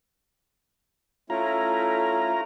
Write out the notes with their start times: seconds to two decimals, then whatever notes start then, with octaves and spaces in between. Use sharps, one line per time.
1.30 A3 C#4 E4 F4 A#5